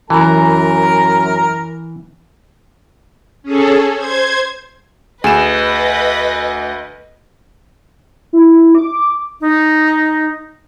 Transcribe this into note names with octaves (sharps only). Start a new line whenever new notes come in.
F#2 E3 A#4 A#5
C#4 G#4 A4
C5 G#6
D2 G#4 B4 D#5 E7
E4
D6
D#4